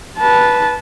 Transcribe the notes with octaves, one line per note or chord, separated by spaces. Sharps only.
B4 A5